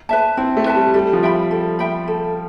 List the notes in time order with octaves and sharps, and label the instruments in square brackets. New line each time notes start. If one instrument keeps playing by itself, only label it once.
[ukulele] B4 E5 A5
[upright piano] C4 [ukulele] E4
[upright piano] A3
[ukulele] B4 E5 A5
[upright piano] G3
[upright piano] G3 [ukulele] A4
[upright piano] F3
[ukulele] E5 G5 B5
A4
E5 G5 B5
A4